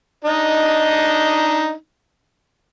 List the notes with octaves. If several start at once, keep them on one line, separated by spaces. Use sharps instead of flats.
D4 D#4 D#5